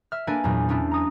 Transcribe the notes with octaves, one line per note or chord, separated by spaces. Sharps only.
E5 F6
A#3 D4 A4 B4 D5 G#5
E2 A#2 F#3
B3 C#4 D4 E4
A#5 D#6